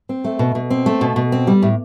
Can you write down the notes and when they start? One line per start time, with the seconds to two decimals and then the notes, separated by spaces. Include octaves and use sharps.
0.09 C4
0.24 A3
0.39 B2
0.55 B2
0.70 C4
0.86 A3
1.01 B2
1.16 B2
1.32 C4
1.47 G3
1.62 A2